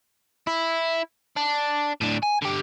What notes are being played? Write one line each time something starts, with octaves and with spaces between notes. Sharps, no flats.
E4
D4
A2 D4
G#5
D3 G4